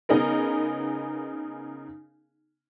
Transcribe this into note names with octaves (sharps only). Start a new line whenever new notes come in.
C#3 B3 D#4 G#4 A#4